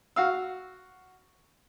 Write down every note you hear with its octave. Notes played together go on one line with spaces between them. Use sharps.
F#4 F5 E6